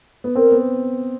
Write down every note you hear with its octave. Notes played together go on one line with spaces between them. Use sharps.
B3
C4 A#4
B3